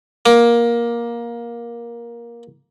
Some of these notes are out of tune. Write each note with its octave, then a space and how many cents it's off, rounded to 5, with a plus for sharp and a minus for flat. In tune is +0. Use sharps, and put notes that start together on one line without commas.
A#3 +15 D6 +0